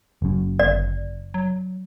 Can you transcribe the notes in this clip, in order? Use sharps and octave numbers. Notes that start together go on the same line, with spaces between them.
F#1 F#2
G1 D5
F#3